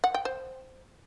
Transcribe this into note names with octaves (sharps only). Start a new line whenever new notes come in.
F#5
G5
C5